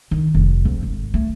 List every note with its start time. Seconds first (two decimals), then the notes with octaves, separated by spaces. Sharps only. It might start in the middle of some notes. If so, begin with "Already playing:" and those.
0.11 D#3
0.34 F1
0.65 F2
0.83 G#1
1.14 A3